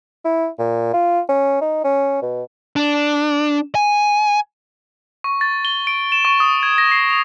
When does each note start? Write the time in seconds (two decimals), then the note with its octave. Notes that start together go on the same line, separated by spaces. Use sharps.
0.25 E4
0.59 A#2
0.93 F4
1.29 C#4
1.61 D#4
1.84 C#4
2.22 B2
2.76 D4
3.75 G#5
5.24 C#6
5.41 A6
5.65 G7
5.87 D7
6.12 E7
6.25 C#6
6.40 D#6
6.63 G#6
6.78 A#6
6.92 C7
7.10 F7